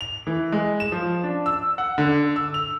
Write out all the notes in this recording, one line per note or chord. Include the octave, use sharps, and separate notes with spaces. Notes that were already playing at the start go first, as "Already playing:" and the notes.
F7
E3
G#3
E7
F3
D4
E6
F#5
D3
E6
F7